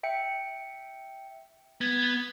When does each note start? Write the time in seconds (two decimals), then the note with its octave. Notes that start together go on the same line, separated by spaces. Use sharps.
0.03 E5 G5 C#7
1.81 B3 G#6